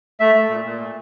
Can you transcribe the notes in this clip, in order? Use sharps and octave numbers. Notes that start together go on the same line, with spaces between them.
A3 E5
A3
A#2
A#2
A3